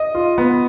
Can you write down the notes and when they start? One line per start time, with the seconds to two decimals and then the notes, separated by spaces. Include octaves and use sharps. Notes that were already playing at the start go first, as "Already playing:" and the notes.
Already playing: D#5
0.15 F4
0.38 B3